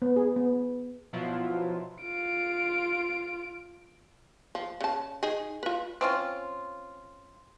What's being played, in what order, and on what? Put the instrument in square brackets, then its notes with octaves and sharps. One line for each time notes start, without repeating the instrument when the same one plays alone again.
[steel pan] B3
G#4
B3
[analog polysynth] B2 F3 F#3 E4 F4
[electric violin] F4 D7
[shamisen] F3
C#3 A5
D#4 G#4
F4 B4
[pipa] C4 C#4 F4